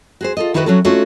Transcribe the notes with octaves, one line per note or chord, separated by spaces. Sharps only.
F#4 G#4 C5
F4 A4 D#5
D#3 E4 F#4 G4 A#4 B4
F#3 C#4 F#4 A4
A3 C#4 D#4 F4 F#4 A4